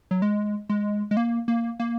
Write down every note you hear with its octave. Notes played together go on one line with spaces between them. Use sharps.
F#3
G#3
G#3
G#3
A#3
A#3
A#3